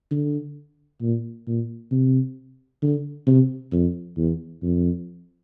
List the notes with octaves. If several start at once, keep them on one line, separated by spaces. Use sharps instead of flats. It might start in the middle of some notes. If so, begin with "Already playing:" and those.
D3
A#2
A#2
C3
D3
C3
F2
E2
F2